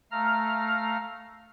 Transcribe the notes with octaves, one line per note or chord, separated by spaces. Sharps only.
A3 F5 A#5 F6